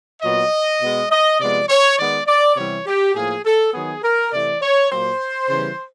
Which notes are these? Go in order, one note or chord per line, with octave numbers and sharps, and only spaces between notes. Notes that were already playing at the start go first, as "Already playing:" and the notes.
A#2 F#3 B3 D#5
B2 G#3 B3
D#5
C3 F3 G#3 B3 D5
C#5
D#3 G#3 B3 D5
D5
C3 E3 G3 B3 C#5
G4
A2 F3 A#3 G#4
A4
D#3 F#3 B3 G#4
A#4
C3 E3 A3 D5
C#5
A#2 F#3 A#3 C5
C#3 E3 G3 B3